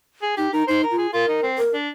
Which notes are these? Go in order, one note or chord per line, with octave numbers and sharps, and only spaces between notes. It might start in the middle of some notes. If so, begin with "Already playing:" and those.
G#4
D#4 G4
D#4 A#4
D#4 C5
A#4
F4
G#4
F4 A#4
D#4
C4
A#4
D4